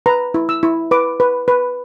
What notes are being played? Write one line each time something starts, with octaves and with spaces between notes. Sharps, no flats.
B4 A#5
E4
E6
E4
B4 D6
B4
B4